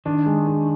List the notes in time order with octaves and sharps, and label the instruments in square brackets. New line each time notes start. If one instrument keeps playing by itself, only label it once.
[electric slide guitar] D#3 [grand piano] D4
[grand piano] G#3
D4